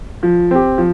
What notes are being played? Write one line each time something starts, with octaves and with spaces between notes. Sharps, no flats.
F3
C4 G4
F3